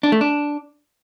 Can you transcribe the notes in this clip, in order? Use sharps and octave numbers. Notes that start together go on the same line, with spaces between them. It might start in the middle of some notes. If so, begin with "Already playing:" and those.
D4
A3
D4